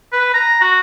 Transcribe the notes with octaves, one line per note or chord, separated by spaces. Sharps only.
B4
A#5
F#4